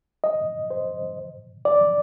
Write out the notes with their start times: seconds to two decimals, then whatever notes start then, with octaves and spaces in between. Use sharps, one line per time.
0.24 D#5
0.71 C5
1.65 D5